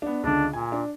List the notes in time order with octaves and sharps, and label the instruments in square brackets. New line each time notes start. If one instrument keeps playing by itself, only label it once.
[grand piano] B3 D4
[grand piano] C#2 D3 [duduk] D4
[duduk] A#2 [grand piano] G#5
[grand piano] D4